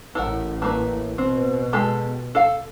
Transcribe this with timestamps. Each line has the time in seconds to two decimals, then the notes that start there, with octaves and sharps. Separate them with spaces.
0.15 A1 A2 A4 A#4 F#5
0.62 A3 A#3 B4
1.18 B2 C4
1.73 G#3 G4 A4
2.35 A4 F5